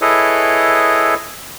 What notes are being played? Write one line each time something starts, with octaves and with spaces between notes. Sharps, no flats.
E4 G#4 A4 B4 C#5 D#5